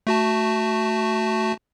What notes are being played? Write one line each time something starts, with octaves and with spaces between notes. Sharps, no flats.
A3 F#4 A5